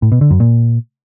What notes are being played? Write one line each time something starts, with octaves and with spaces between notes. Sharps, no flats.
A2
B2
D3
F#2
A#2